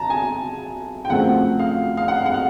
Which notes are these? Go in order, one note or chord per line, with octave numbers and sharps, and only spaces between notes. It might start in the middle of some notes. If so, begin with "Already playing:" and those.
Already playing: A5 A#5
G#5
G5
F#2 C#3 F3 A3 C4 F#5
F5
F5
F#5
F#5
F5